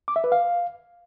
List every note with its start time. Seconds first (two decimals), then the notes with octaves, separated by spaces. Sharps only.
0.08 D6
0.16 E5
0.24 B4
0.32 F5